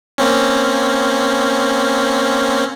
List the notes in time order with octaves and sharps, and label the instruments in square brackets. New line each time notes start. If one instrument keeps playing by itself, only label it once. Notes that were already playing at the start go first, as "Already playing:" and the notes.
[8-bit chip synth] A#3 C4 C#4